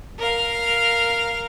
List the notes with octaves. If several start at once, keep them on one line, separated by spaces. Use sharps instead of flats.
A#4 F5